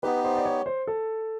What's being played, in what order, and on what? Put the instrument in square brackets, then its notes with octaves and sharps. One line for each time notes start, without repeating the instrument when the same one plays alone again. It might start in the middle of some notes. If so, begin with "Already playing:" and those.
[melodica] B3 D#4 G4 [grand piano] B4
[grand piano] C5
D5
C#5
C5
A4